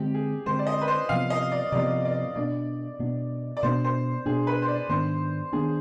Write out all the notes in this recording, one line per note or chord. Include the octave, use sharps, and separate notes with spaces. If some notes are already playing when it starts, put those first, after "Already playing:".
Already playing: D3 G#3 C4 G4
G#4
D3 G#3 C4 C5
D5
D#5
B4
C5
C3 F3 B3 F5
D#5
D5
C3 F3 B3 D5
D5
B2 B3 D4 D5
B2 B3 D4
D5
B2 B3 D4 C5
C5
B2 B3 D4 G#4
B4
C5
D5
G#2 D#3 B3 D4 C5
D#3 B3 D4 G#4